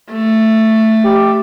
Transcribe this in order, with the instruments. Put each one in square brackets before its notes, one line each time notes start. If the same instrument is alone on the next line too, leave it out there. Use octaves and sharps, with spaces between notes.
[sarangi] A3
[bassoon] G4